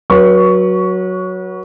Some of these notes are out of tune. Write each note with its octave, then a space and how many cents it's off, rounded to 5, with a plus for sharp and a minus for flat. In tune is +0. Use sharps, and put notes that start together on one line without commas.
F#3 +0 B4 -35 C#6 +15